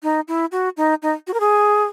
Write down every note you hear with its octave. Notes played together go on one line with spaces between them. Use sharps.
D#4
E4
F#4
D#4
D#4
F#4
A#4
G#4